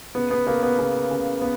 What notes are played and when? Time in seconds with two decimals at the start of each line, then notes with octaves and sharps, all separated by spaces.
0.15 C#3 B3
0.31 B3
0.47 C#3 A#3
0.63 B3
0.79 C#3 B3
1.11 C#3
1.41 B3